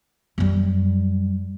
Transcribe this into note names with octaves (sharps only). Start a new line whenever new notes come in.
F#2 G3